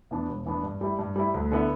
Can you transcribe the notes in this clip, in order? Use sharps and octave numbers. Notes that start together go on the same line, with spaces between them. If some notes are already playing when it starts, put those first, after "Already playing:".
E2 E3 B3 D4
E1
E2 E3 B3 D4
G2
G3 E4
G2
G3 E4
D2
D3 B3 E4